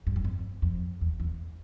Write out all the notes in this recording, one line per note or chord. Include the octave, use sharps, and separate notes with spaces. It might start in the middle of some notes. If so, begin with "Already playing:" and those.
G2
F#2
F2
F2
E2
E2